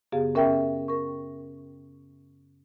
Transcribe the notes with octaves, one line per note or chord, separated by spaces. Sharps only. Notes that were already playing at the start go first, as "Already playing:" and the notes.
F#2 C#3 B3 G4 G#4 F5
C#4 A#4 E5 G5
A#4 C#6